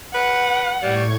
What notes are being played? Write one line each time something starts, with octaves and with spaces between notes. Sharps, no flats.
B4 F#5
A2 G3 C#6 G#6